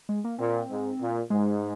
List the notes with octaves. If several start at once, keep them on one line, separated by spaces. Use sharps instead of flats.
G#3
A#3
A#2 C4
G#2
A#2
G#2 G#3